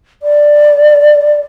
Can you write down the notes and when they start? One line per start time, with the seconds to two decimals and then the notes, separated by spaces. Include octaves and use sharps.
0.23 D5